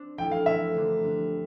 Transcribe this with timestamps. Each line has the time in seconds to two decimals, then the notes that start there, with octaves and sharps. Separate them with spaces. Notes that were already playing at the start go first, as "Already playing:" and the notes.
Already playing: C4 D4
0.18 F3 A3 E4 G5
0.32 F5
0.46 F3 A3 C4 E4 E5
0.75 D3 F3 A#3 D4
1.04 D3 G3 D4